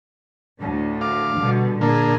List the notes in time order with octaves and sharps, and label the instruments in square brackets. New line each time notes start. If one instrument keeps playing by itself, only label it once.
[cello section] D2 A2 D3
[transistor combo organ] F5 D6
[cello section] B2 D3 G3
[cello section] A#2 G#4 [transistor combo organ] D3 A#3